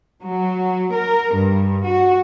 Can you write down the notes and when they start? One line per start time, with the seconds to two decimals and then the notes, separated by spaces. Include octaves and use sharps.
0.25 F#3
0.93 A#4
1.36 G2
1.88 F#4